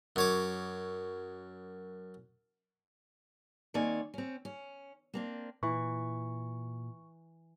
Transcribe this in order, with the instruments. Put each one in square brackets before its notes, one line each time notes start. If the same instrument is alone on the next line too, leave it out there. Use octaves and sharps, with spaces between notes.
[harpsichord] F#2 C#5 D6
[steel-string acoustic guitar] D#3 A#3 C4 C#5 D5 G#5
C4 C#4
C#4
A#3 C4 D4
[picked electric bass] A#2 [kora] E3 [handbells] C#6